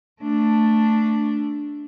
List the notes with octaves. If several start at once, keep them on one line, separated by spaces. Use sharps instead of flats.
A3 D4